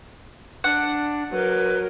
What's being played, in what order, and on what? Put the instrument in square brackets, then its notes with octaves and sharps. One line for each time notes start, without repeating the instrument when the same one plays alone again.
[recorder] D4 [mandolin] F#5
[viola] F#3 A#4 [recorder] B4